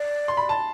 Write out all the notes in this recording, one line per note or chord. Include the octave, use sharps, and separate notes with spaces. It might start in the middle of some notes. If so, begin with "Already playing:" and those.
Already playing: D5
C6
B5
A5